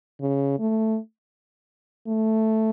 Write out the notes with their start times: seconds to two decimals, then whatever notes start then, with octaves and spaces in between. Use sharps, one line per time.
0.21 C#3
0.59 A3
2.08 A3